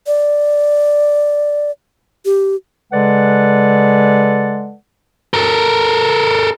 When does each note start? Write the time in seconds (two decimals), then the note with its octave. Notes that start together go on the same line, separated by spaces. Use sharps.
0.07 D5
2.25 G4
2.92 C#3 G#3 A4 B4 D5 F#5
5.34 A4 A#4